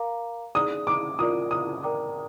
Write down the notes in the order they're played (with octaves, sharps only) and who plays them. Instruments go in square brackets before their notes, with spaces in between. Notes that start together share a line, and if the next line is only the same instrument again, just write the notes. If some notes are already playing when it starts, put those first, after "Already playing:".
Already playing: [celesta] A#4 F5 A#5 D6
[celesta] D#4 G#4 D5 [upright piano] D#6
[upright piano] D6
[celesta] F4 A#4 D5 [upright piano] D#6
[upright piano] D#6
[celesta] A#4 D5 G5 A#5 D6